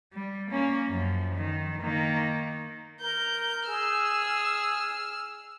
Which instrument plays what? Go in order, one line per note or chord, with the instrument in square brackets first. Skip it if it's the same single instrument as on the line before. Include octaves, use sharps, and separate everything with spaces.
[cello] G3
A#3 C#4
F#2 F3
D#3
D#3 A#3
[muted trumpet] A#4 [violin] G6
[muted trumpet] G#4 [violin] E6 F6